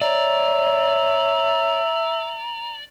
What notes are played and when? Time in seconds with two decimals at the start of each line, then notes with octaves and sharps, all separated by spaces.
0.02 C#5 D5 E5 A#5